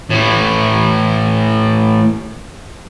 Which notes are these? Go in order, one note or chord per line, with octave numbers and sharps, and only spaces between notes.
A2 E3